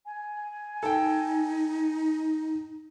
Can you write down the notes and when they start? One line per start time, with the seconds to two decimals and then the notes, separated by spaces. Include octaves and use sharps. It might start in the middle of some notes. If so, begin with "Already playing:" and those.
0.06 G#5
0.83 D#4 A4 G5